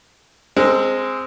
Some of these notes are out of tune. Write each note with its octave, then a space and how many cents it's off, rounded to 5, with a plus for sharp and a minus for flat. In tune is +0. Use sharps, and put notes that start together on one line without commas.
G#3 -5 C4 +0 A4 +45